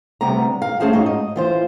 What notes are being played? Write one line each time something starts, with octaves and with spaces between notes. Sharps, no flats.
D2 C3 G3 B3 A#5
F5
A3 C#4 G#4 C5 F5 A5
G#2 D#4 F#4 C#5
D#5
E3 F4 C5